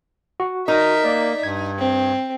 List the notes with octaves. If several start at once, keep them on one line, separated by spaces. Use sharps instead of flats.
F#4
D#4 A#4 E5
A#3 D5
G2 G#6
C4